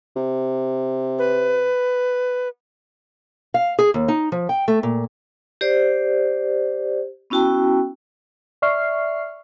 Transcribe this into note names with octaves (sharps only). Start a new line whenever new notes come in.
C3
B4
F5
G#4
D#2
D#4
F3
G5
A3
A#2
G4 C5 D5
B3 C#4 E4 F#4 G5 A5
D5 E5 C#6 F6 C7